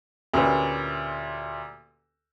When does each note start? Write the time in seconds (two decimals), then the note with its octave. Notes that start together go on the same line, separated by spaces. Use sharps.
0.34 D2 A#2 C#4 G4 B4 E6